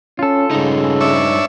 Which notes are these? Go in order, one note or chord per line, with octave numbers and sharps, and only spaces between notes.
C#4 F4 A4
G2 C#3 D#4
D4 C#5 E5